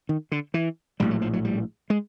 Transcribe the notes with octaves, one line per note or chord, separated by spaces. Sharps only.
D#3
D3
E3
A#1 A2 G3
F#3
F3
F#3
G3
G#3